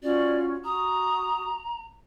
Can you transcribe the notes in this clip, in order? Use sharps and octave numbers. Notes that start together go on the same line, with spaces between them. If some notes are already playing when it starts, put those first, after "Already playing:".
C#4 F4 F#4 D5
F#4 A#5 D#6